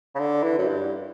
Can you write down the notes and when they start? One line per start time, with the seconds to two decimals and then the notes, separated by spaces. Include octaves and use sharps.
0.15 C#3
0.19 D3
0.43 E3
0.58 F#2
0.67 G2